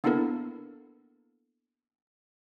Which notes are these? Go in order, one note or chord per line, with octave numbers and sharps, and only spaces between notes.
A#3 B3 D4 E4 A4 A#4